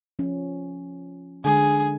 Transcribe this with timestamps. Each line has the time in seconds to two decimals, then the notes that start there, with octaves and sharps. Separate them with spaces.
0.19 F3 C#4
1.44 D3 G#3 G#4